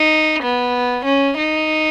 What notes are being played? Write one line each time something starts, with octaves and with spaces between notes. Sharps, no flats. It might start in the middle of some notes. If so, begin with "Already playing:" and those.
Already playing: D#4
B3
C#4
D#4